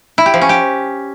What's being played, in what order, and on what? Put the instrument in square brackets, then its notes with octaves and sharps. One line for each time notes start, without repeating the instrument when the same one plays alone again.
[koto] E4
G4
F3
C#4
G4